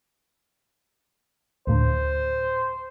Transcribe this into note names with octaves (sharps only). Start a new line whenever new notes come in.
D2 A2 D3 C5